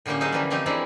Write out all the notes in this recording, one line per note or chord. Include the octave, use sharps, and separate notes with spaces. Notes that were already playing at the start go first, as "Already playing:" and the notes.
A2 D3 G3 A#3 C#4 G4
F#3 D#4 G#4 C5 E5 F5
D3 E3 F3 G3 C#4 D4
E3 F3 A3 C4 D#4 G4
E3 F3 G#3 A#3 D4 E4